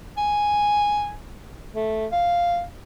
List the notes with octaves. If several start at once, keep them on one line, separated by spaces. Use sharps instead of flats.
G#5
A3
F5